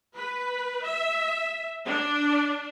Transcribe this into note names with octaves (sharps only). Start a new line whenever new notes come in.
B4
E5
D4